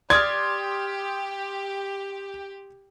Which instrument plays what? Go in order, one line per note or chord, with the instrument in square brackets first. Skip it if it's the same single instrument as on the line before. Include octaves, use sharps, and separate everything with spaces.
[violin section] G4 [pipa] D5 [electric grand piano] C6 D#6 F6 [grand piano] G#6